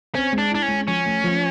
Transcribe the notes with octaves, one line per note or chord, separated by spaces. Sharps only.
C4 C#4
G#3
D4
D4 E4
C#4
G#3
F3 C#4
A3
F3